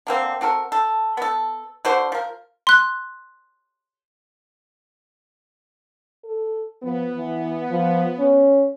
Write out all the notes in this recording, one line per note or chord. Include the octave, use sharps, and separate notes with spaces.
D3 A#3 C4
C4 F#4 A4 A#4
A4
B3 A4
D3 F#4 C5
F3 A#4
C6 F#6
A4
F3 B3
E3
F3
C#4